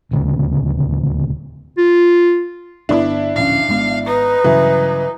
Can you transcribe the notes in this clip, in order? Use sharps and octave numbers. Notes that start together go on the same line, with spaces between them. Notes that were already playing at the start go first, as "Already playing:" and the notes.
D#1 D2 C#3
F4
G1 E3 B3 D4 E4
D1 A#1 C#4 F5
G#1 G#3 B3
D#4 B4
G2 C#3 E3 F#3